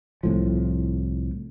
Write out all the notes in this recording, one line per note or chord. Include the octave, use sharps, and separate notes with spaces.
C2 A2 F3